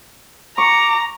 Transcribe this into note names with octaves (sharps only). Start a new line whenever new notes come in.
A#5 C#6 D6